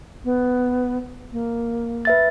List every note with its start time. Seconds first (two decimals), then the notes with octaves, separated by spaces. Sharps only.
0.25 B3
1.32 A#3
2.05 B4 E5 A6